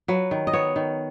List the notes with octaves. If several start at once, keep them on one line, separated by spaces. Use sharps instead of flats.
F#3 B4
D#3
D#5
B3 C#5
D#3